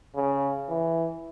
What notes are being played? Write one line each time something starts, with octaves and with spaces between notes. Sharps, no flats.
C#3
E3